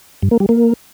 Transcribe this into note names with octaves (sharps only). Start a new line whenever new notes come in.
G2
A#3
G3
A#3